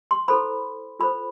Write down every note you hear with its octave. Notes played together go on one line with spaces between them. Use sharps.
C6
E4 A4 C5 B5
F4 A4 C5 B5